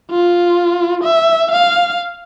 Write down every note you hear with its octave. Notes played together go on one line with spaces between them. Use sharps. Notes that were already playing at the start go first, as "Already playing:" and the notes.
F4
E5
F5